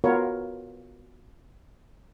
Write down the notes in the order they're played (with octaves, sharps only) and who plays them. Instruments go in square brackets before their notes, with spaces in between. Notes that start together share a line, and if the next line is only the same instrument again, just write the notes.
[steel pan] B3 F4 F#4 A#4 B4 C#5